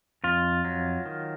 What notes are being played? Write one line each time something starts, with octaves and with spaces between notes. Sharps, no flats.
F2 F4
F#3
D#3